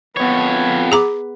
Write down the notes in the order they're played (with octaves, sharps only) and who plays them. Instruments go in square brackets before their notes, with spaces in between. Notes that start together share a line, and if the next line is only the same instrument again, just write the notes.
[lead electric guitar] F2 C#5 [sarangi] B3
[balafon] G#4 A#5 D6